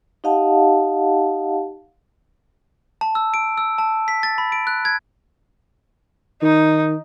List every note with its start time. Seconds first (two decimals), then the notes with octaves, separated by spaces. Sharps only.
0.24 D#4 G4 D#5 F5 F#5 A5
3.01 A5
3.15 E6
3.34 D7
3.58 E6
3.78 A5
4.08 B6
4.23 A6
4.38 B5
4.52 D7
4.67 F#6
4.85 G#6
6.42 D#3 D#4